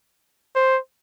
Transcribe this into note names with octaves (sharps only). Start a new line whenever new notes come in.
C5